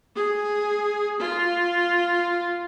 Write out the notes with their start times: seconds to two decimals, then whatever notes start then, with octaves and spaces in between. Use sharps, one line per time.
0.16 G#4
1.20 F4